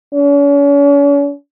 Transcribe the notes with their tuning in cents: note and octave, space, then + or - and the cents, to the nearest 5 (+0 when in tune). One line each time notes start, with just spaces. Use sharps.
C#4 +45